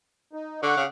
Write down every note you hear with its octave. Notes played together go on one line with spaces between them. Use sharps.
D#4
D3 F#5 C#6 D6
C#3